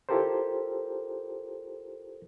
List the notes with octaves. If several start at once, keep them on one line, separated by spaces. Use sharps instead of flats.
E4 F4 G4 A4 A#4 C5